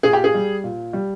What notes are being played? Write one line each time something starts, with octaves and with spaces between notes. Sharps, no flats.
A#2 G#4
G4
G#4
G3
A#2
G3